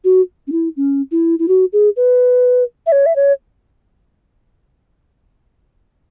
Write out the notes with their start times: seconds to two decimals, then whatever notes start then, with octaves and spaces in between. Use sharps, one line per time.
0.04 F#4
0.47 C#4
0.52 E4
0.76 C#4
1.12 E4
1.39 E4
1.48 F#4
1.73 G#4
1.97 B4
2.87 E5
2.92 C#5
3.06 E5
3.16 C#5